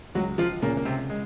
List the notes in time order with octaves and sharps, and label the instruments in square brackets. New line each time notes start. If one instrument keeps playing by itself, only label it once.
[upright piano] C#2 [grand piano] F#3 F#4
[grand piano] F3 F4
[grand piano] A#2 A#3 [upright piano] C#3 G#3 C#4 G#4
[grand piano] A#3
C3 C4
G#3